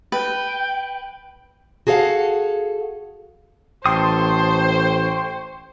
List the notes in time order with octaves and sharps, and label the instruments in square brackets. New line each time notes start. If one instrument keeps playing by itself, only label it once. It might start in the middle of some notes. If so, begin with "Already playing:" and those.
[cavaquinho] B4 [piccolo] G5
[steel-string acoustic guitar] F#4 G#4 A4 B4 F5 F#5
[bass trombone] A1 [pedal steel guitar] A4 D#6 [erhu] C5 [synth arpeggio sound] G5 C6 C#6